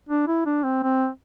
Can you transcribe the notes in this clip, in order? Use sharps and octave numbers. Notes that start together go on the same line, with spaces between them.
D4
E4
D4
C4
C4